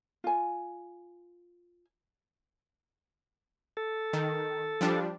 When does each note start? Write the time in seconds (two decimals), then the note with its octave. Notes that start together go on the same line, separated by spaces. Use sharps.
0.24 F4 G#5
3.77 A4
4.13 D#3
4.81 F3 G3 D4